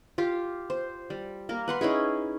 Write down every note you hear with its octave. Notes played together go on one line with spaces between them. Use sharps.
F4 G4
C5
G3
A#3 A#4
B4 F#5 C6
C#4 D#4 E4 G#4